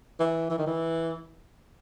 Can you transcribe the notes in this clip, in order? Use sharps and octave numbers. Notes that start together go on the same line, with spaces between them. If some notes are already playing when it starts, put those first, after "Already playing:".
E3
E3
D#3
E3